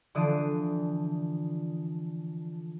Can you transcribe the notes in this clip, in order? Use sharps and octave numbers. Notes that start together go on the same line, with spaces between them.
D3 E3 F3 D#6 C7 D7